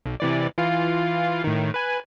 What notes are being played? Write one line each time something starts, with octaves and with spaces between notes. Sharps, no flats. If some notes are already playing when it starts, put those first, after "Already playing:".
B1
C3 E3 D5
E3 F4 F5
A2 D#3
B4 G#5